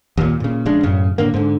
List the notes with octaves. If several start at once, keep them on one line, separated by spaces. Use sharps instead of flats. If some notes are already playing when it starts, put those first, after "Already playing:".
D#2 A#2
A#2 C#3
A#1 C#3 G#3 D4
F#2 A2 C#3
A2 D3 A#3
G#2 D3